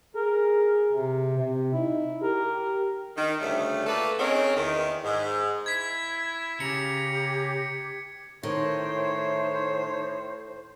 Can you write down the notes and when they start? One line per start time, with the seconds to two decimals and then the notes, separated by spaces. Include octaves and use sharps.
0.15 G#4 A#4
0.92 C3
1.37 C3 C4
1.74 D#4 E4
2.22 G4 A#4
3.16 D#3
3.40 D2 C#3 G3 A3
3.86 A3 A#3 F4 A4 B4
4.19 C4 C#4 D#4 G#4 A#4
4.56 E2 D#3
5.04 G#2
5.66 E4 G#6 B6
6.60 C#3 G4 A#5 C#7
8.43 A2 D#3 C5 C#5